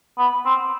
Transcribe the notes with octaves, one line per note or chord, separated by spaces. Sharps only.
B3
C4